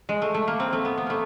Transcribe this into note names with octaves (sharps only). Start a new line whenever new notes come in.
G#3
A3
A3
A#3
C4
A3
B3
B3
A3 A#3